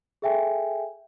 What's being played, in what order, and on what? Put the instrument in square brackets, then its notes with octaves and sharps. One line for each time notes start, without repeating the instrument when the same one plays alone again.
[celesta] G#4 A4 E5 G5 G#5